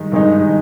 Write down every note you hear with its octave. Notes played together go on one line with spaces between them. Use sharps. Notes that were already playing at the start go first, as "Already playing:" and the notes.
Already playing: G2 D#3 G#3 D#4
G2 D#3 G#3 D#4